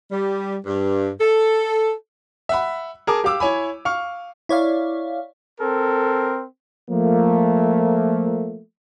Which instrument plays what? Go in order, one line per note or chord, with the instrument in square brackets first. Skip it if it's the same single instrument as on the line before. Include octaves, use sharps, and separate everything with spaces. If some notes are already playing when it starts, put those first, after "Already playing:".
[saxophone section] G3
G2
A4
[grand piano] E5 F#5 B5
G#4 A#4 A5 D6
G4 F5 D6 E6
E4 C#5 G#5 B5
F5 C#6 F6
[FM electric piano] E4 C#5 D5 F5
[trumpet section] C4 A#4 [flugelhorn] A4
[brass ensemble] F3 A3 A#3